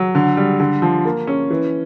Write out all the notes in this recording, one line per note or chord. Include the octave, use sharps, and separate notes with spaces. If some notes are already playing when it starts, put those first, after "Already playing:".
Already playing: F#3
D3
G3
D3
F3
A#3
C#4
E3